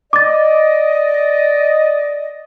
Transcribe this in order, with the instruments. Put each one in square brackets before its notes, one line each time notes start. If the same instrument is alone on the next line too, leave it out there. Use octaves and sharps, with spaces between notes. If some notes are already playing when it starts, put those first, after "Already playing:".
[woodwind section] D5 D#5 [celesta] D6 A6